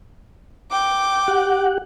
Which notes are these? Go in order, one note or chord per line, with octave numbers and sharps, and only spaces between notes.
G5 D6
G4 F#5